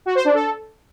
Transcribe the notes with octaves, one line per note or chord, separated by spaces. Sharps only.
F#4
C5
D4
A4